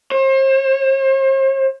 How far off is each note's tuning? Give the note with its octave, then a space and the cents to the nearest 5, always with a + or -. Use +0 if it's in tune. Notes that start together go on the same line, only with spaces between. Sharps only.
C5 +40